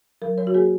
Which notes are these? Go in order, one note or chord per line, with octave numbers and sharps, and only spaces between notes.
F#3 A#4
F#3 C#5
F#4
A#3 G#4